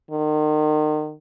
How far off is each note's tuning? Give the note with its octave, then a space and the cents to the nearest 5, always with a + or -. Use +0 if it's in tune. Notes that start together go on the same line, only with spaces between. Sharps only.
D#3 -35